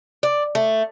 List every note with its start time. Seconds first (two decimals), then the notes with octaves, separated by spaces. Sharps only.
0.23 D5
0.55 A3